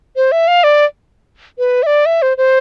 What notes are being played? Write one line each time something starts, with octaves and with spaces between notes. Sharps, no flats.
C5
E5
F5
D5
B4
E5
D5
E5
C5
C5